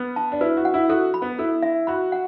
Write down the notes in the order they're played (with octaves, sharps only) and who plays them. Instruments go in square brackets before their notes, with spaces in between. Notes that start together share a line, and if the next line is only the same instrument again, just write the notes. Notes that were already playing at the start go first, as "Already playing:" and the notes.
Already playing: [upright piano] B3 [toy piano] B4
[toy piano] A5
[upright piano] D4
[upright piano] E4 [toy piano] B4
[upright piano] F#4
[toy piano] F#5
[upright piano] E4
[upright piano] F#4 [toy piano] A4
[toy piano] B5
[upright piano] B3
[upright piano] E4 [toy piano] A4
[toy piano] E5
[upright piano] F#4 [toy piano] B5
[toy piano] F#5